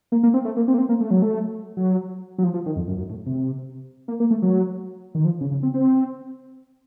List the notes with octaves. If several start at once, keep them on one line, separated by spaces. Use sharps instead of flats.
A#3
A#3
C4
A3
A#3
C4
A#3
C4
A#3
A3
F#3
A3
F#3
F#3
F3
F3
D#3
F2
F#2
F#2
A2
C3
A#3
A#3
A3
F#3
D#3
F3
C#3
C#3
C4
C4